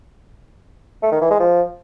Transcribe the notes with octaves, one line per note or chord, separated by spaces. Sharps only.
A3
D#3
E3
G#3
F3